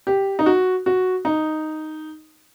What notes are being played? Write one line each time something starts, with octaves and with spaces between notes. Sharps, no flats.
G4
D#4
F#4
F#4
D#4